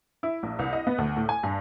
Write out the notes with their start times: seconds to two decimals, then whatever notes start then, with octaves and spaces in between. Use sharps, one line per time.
0.23 E4
0.43 A#1
0.59 C2
0.73 D#5
0.87 B3
0.98 D2
1.17 A2
1.29 G#5
1.43 G2